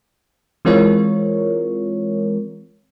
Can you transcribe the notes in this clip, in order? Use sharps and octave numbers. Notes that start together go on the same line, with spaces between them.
E3 G#3 C4 F4 A#4 C#5